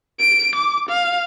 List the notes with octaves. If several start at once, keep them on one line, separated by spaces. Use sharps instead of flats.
D7
D6
F5